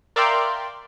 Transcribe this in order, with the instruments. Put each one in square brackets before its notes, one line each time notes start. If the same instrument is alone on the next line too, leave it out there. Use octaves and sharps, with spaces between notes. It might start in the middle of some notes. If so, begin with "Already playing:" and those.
[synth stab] A#4 D5 E5 F5 G5 C6